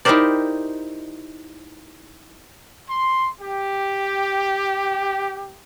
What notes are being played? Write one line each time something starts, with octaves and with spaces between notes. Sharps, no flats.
D#4 E4 G4 A#4 C5 D5
C6
G4